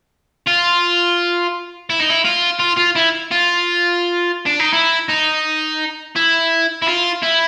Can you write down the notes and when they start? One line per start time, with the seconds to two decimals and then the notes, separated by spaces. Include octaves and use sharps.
0.47 F4
1.90 E4
1.99 D#4
2.09 E4
2.24 F4
2.60 F4
2.78 F4
2.96 E4
3.32 F4
4.46 D4
4.60 D#4
4.73 E4
5.08 D#4
6.15 E4
6.82 E4
6.87 F4
7.23 E4